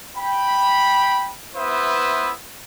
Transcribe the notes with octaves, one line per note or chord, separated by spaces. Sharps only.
G5 B5
B3 E4 B4 C5 E5 D#6